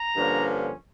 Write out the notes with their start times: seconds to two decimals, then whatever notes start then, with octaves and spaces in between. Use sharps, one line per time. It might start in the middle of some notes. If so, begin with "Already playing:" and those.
Already playing: A#5
0.16 G2 D3 F3 A#3 C#4